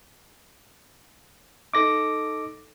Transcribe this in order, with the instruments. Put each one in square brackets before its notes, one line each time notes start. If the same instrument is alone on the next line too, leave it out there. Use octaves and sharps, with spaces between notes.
[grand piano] D#4 A4 [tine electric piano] D6 A#6